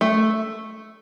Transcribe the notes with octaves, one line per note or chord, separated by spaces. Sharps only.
A3